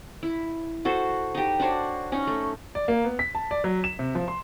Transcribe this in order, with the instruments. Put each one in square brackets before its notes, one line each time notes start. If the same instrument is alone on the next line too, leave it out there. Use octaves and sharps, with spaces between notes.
[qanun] E4
F#4 A4 C5
D#4 G4
D4 F#4 C5 C#5
C#4 D#4
A3
[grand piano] D5
A#3
B3
B6
A5
D5
F#3
E7
C3
F3
C6